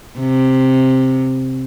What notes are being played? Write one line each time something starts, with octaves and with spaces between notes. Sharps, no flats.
C3